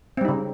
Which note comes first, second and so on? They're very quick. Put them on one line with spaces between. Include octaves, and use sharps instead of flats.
C4 G3 D#4 C#3